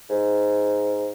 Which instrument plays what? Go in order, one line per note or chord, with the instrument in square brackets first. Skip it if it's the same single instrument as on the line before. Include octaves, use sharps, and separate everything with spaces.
[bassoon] G#2